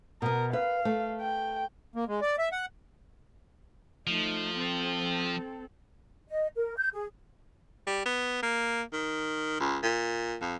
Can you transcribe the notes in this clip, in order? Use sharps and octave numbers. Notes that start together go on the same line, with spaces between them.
B2 B3 A#4
B4 F5
A3
G5
A#3
G#3
D5
E5
F#5
F3 A3 D#4
C4 A4
D#5
A#4
G6
G#4
G3
B3
A#3
D#3
C#2
A#2
F2